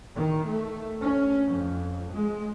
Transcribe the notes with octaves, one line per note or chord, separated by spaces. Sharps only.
D#3
A3
C#4
F2
G#3